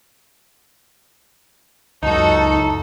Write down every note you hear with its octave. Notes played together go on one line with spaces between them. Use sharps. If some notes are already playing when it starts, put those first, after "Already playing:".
C#2 F#2 D#4 F#4 A4 A5